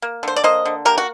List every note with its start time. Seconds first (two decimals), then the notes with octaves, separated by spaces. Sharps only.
0.02 A#3
0.23 D3 C5
0.36 D5
0.44 A#3 C5 D#5
0.66 D3
0.85 A#3 G4 A#4
0.98 F#4